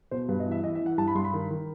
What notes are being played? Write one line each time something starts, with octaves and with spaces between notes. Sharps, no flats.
B2 C5
G2 B4
D#5
E3
E5
E3 D#5
E5
E3
F#5
G2 A5
B5
G2 C6
B5
D#3
D#3